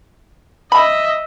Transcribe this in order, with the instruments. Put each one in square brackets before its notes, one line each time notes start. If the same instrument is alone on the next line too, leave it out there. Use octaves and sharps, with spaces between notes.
[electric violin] D#5 E5 [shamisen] B5